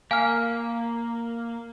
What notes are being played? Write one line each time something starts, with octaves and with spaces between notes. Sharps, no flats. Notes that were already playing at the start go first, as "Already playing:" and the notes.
A#3 F5 G#5 F6